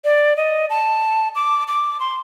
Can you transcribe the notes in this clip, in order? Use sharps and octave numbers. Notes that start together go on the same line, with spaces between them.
D5
D#5
A5
D6
D6
C6